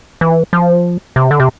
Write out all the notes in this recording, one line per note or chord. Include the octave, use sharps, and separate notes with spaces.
E3
F3
C3
D3
C3